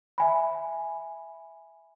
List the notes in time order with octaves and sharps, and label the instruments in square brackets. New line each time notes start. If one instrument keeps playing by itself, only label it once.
[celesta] E5 G#5 B5